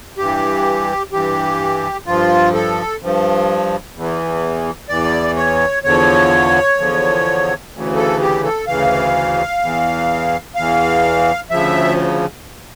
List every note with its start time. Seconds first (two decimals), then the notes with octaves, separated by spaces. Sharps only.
0.17 G2 E3 G4
1.12 G2 E3 G4
2.06 G2 F3 F4
2.54 A4
3.01 G2 F3
3.95 E2 E3
4.89 E2 E3 D5
5.36 C#5
5.84 E2 D3 F3 C#5
6.78 E2 D3 F3
7.72 D2 C#3 E3
7.96 A4
8.21 G4
8.44 A4
8.67 D2 C#3 E3 F5
9.61 E2 E3
10.55 E2 E3 F5
11.50 D2 C#3 F3 E5